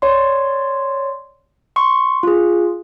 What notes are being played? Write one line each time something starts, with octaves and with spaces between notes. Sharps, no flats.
C#5 D5 C6
C6 C#6
F4 G#4